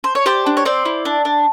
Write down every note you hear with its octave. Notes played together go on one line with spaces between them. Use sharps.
C5
C#5
G4 C5 D5
D4
C#5
C4 C5 D5
E4
D4
D4